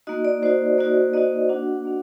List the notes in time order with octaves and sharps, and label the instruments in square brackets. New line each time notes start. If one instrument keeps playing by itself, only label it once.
[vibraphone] A#3 D#4 F#4 D#5
D5
A#3 D#4 F#4 C5
A#3 D#4 F#4 D5
A#3 D#4 F#4 D#5
A#3 D4 F#4 F#5
A#3 D4